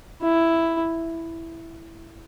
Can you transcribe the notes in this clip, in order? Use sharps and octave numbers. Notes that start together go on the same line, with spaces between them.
E4